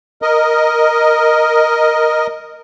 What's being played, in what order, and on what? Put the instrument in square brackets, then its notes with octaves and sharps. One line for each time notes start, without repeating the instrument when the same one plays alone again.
[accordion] A#4 D#5